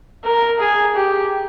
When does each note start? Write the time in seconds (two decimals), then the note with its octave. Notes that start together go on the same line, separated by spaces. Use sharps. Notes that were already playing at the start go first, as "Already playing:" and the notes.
0.25 A#4
0.59 G#4
0.95 G4